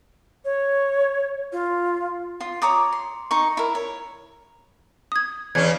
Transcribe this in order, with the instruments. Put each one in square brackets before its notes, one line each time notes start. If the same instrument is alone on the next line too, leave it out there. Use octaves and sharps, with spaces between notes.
[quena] C#5
F4
[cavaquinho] F4
C#5 A#5 D6 D#6
C6
D#4 C#6
E4 A#4
C#5
[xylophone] D#6 G#6
[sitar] E2 C#3 C#4 [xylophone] G#6